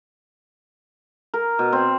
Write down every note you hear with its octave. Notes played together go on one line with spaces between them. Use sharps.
A#4
B2
C4